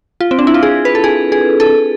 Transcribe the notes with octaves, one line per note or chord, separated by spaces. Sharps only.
F4
C4
D4
E4
F4
G#4
B4
A4
G#4
G#4
A4